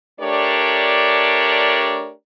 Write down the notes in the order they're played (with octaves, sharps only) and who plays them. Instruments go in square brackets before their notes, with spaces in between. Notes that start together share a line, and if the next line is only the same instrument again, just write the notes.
[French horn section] A3 D4 G4 A#4 C#5 D5